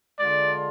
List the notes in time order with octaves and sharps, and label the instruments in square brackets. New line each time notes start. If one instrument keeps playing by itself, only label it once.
[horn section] D3 G#3 D4 F4 D5